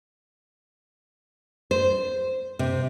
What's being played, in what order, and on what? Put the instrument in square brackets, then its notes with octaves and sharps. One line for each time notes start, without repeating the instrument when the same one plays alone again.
[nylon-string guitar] C5
C3